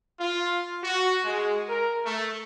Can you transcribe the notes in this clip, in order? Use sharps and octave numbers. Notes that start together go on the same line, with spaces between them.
F4
F#4
G#3
A#4
A3